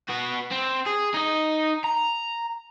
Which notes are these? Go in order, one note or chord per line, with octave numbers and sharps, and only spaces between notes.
B3 F#4
C4
G#4
D#4 D#5
A#5